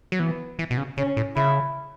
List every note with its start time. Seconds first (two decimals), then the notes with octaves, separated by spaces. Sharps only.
0.12 F#3
0.19 E3 B3
0.59 E3
0.70 B2
0.78 C#3
0.96 C#3 C#4
1.17 A2
1.35 C#3 E4